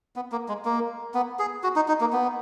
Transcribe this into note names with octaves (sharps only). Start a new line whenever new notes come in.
B3
A#3
G#3
A#3
B3
G#4
F#4
D#4
D#4
A#3
B3